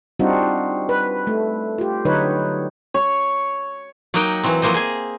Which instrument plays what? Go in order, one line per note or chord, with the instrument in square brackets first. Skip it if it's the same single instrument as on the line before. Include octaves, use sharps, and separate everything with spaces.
[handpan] G3 C4 D4 D#4 F4 F#4
B4
A3
F4 G4
D3 F#3 D#4 B4 C#5
[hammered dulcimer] C#5
[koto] F#3 A#3 D#4 D#5 F#5 G5
E3 F#3 C4
F3 F#3 A#3 C5 D#5
G#4 G#5